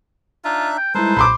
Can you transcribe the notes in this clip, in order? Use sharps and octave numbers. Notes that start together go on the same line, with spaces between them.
D4 D#4 F4 E5
G5
G3 G#3 D#4 E4 A4 B4 C5
B1 A#2 B5 C6 D6